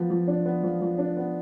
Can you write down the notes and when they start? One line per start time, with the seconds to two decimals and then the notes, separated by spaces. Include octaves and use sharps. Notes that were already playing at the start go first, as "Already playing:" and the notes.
Already playing: F3 B3
0.10 F3
0.28 D4
0.46 B3
0.63 F3
0.81 F3
0.98 D4
1.17 B3